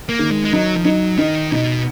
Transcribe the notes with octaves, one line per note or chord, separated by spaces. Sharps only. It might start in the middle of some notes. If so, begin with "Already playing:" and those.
A#3
D#3
G#3
G#3
F#3 D#4
F3
F#3 D#4
D#3 D#4
B2 D#4